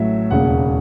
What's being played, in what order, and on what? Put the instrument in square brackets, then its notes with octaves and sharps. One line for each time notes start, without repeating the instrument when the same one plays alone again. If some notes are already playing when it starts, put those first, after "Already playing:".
Already playing: [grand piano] A1 A2 F#3 E5
E1 D#2 C#3 F#5